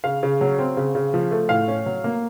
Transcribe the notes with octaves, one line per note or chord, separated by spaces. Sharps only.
C#3 F5
C#3
F#3
C4
C#3
C#3
F3
A3
A2 F5
C#4
F#3
A#3